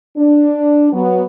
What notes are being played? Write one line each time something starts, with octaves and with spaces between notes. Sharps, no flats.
D4
F#3 B3